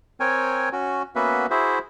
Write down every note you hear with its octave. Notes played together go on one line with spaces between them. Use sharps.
C4 A#4 C#5 G5 G#5
C#4 F#4
A#3 B3 C#4 F#4 B4 E5
E4 F#4 G#4 C5 E5